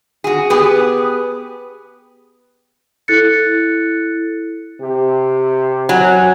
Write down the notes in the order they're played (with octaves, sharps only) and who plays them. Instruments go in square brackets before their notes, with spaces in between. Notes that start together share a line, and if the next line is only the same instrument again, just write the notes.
[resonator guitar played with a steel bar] F#4 G#4
B3 G4 G#4 B4
[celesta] E4 A4 F#6 A6 C#7
[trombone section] C3 G4
[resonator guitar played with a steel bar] F#3 [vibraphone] G#5